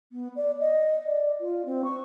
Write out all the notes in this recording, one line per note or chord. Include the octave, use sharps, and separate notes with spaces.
B3
D5
D#5
D5
F4
C4
C#6